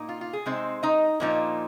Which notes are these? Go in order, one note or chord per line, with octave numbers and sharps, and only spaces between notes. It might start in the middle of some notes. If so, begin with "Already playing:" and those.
Already playing: A#2 A#3 D#4
F4
F4
G#4
C3 G#3 C4 D#4 C5
D#4 D#5
A#2 F3 A#3 D#4